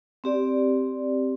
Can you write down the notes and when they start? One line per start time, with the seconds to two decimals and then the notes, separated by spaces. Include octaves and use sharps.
0.24 C4 G4 D5